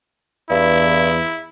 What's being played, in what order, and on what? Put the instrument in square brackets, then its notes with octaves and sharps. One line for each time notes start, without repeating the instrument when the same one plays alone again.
[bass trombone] E2 [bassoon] G2 [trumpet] E4